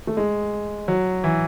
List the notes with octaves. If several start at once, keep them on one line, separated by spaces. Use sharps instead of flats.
A3
G#3
F#3
E3